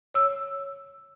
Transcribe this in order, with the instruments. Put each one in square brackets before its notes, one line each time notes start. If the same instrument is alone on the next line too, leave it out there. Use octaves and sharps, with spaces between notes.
[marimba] C#5 E6